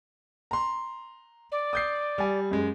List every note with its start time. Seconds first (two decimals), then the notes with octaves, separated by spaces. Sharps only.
0.51 A#5 C6
1.52 D5
1.73 D#6 G6 C7
2.18 G3 G#5
2.51 F#2 G#3